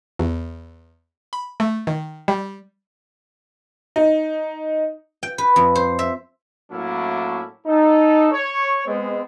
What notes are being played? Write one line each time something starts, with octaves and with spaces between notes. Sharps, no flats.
E2
B5
A3
D#3
G3
D#4
G5
B4
F2
C5
E5
A2 F#3 A#3 C#4 D4 E4
D#4 A4
C#5
G#3 B3 C4